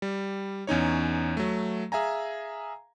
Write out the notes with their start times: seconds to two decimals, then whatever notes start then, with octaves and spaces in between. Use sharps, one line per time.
0.02 G3
0.67 E2 C#4 D#4 C#5
1.37 F#3 A3
1.92 G#4 E5 F5 G#5 A#5